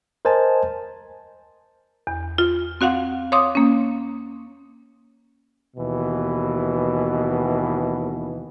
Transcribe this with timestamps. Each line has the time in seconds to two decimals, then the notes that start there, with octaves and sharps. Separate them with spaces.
0.25 A#4 C5 D#5 G#5 A5
2.07 E2
2.38 F4
2.81 C4 F#4 F5 F#5
3.32 C#5 F5 C6 D6 D#6
3.55 A#3 C#4
5.77 D#2 B2 E3